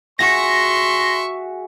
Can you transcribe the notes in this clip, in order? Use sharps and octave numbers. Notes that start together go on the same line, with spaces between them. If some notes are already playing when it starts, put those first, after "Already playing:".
F#4 G#4 E5 C6 C#6 A#6